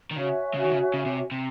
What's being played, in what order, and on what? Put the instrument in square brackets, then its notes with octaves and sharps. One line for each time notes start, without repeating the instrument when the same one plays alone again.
[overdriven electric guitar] D#3
[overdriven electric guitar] C#3 [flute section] F#4 C#5 E5 G#5
[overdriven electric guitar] C#3
D#3
C#3
C#3
C3
C3